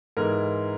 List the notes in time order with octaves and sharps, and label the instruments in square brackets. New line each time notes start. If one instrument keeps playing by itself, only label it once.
[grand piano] G#2 E3 G#3 A#4